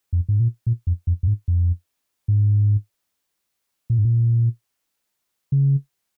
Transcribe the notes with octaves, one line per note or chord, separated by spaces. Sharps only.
F2
G#2
A#2
A#2
F2
F2
F2
G#2
F2
G#2
A#2
G#2
A#2
C#3